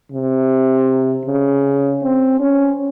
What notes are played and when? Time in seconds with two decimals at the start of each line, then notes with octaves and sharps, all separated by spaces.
0.12 C3
1.25 C#3
2.02 C4
2.40 C#4